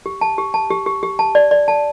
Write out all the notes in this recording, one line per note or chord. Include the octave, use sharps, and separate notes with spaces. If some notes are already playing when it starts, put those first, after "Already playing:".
G4
A5
G4
A5
G4
G4
G4
A5
D5
D5
A5